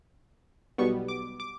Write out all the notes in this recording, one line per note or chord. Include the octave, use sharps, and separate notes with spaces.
B1 B2 G3 B3 C#6
D6
D6